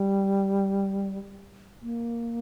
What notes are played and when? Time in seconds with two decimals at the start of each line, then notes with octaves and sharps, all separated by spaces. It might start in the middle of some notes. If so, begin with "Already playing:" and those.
Already playing: G3
1.82 A#3